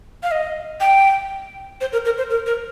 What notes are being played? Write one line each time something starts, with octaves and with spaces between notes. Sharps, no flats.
F5
D#5
G5
C5
A#4
A#4
C5
A#4
A#4